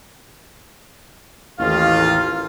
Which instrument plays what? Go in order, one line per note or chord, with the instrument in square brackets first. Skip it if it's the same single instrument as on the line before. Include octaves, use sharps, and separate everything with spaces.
[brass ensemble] A1 D#2 F4 [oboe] F5